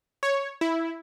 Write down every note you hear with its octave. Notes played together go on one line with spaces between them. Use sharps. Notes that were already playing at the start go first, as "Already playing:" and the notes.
C#5
E4